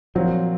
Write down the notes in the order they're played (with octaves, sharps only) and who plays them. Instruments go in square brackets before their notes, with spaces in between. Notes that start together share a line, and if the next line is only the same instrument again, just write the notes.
[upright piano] A#2 F#3 C4 [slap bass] F3